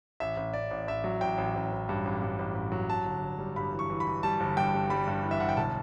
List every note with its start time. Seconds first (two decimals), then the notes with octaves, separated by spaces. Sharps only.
0.20 A1 E5
0.37 A1
0.53 A1 D5
0.71 A1
0.87 A1 E5
1.04 F#3
1.21 A1 G5
1.38 A1
1.55 A1
1.72 A1
1.89 G2
2.05 A1
2.22 G2
2.39 A1
2.55 A1
2.72 F#3
2.89 G2 A5
3.06 G1
3.22 G1
3.39 G3
3.56 G2 B5
3.73 E3
3.79 C#6
3.90 E3
4.00 B5
4.07 E3
4.23 G3 A5
4.40 G1
4.57 G2 G5
4.74 G2
4.90 G3 B5
5.07 G2
5.24 E3
5.31 E5
5.40 G1 F#5
5.49 G5
5.57 B1 A5